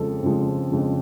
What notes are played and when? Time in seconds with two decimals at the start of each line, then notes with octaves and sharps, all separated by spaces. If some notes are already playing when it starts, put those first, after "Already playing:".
Already playing: F2 C#3 F3 G#3 A4
0.22 F2 C#3 F3 G#3
0.71 F2 C#3 F3 G#3